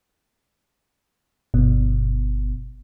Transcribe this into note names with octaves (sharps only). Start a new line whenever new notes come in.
G1 B2